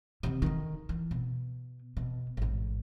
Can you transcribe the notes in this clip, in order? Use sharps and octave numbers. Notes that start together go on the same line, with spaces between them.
C3 D#3
D3 D#3
E3
B2
B2
A1 G#2